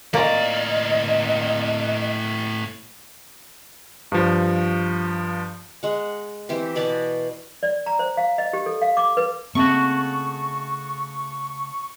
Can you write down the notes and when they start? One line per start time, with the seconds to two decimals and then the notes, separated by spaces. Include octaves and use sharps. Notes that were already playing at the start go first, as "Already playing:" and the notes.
0.14 A2 A#3 C#4 F4 D5 D#5
4.12 G2 F3
5.83 G#3 F#5
6.49 E3 C4 G4
6.75 B2 B3 D5 A5
7.63 D5
7.86 A#5
7.99 C5
8.17 F5
8.38 D#5
8.53 G4
8.66 A4
8.82 F5
8.97 D6
9.17 B4
9.55 C#3 A3 A#3 C4 F#4 C#6